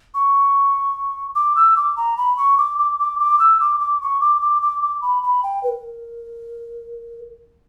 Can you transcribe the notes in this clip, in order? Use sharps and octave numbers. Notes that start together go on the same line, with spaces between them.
C#6
D6
E6
D6
A#5
B5
C#6
D6
D6
D6
D6
E6
D6
D6
C#6
D6
D6
D6
D6
B5
B5
G5
B4
A#4